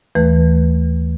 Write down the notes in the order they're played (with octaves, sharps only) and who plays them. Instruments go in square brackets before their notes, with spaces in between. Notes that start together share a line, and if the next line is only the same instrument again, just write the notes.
[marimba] D#2 E3 A3 B4